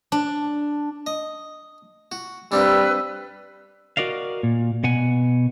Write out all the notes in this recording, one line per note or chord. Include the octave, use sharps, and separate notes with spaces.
D4
D#5
F#4
G2 G3 C4 D4 B4 E6
F#4 A#4 D5 D#5 F5
A#2
B2 F#5 G#5